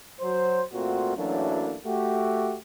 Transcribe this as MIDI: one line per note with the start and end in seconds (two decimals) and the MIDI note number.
0.20 0.60 54
0.20 0.60 72
0.73 1.14 46
0.73 1.14 57
0.73 1.14 60
0.73 1.14 65
0.73 1.14 66
1.16 1.75 42
1.16 1.75 52
1.16 1.75 54
1.16 1.75 57
1.16 1.75 58
1.16 1.75 62
1.85 2.56 57
1.85 2.56 66
1.85 2.56 67